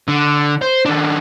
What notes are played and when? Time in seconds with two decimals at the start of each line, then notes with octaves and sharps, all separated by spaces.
0.08 D3
0.61 C5
0.85 D#3 D4